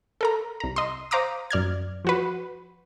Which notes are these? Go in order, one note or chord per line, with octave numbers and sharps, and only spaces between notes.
A4 A#4 A#5
C2 A#5
D#5 C6
C5 F5 A#5 D6 D#6
F#2 D5 F6 G#6
F3 F#4 B4